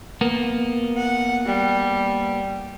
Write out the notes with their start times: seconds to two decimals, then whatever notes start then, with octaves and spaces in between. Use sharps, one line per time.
0.21 A#3 B3
0.97 F#5
1.46 G3